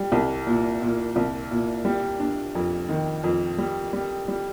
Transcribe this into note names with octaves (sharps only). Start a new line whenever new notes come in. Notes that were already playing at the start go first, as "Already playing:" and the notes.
Already playing: G3
C2
A#2
A#2
C2
A#2
G3
D4
F2
D#3
F2
G3
G3
G3